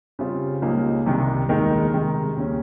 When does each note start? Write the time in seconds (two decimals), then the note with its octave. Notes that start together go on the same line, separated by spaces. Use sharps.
0.19 C#3 G3 C4 F4
0.62 C#2 C#3 G3 A#3 D#4
1.06 C2 C3 D#3
1.49 D#2 D#3 G#3 D#4 A#4
1.92 C3 D#3 G#3
2.36 D#2 C#3 G3 C#4